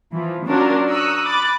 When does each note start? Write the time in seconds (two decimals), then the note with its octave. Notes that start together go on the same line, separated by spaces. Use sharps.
0.14 E3 F3
0.46 F#3 C#4 D4 F4 A#4
0.89 A#5 C#6 D#6 E6 F#6
1.27 B5 D6 F#6 A6